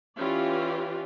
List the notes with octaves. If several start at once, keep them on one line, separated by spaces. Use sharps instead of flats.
E3 C#4 F4 G4 D5